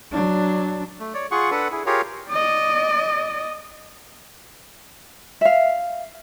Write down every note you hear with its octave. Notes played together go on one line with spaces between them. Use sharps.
F#3 D4
A3
C#5 D5
F4 G#4 F#5 C#6
D4 A4 B4 F#5
E4 G#4
F4 G4 G#4 A#4 C#5 F5
D5 D#5
E5 F5